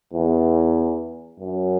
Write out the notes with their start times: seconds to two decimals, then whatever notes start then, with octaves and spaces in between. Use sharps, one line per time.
0.13 E2
1.40 F#2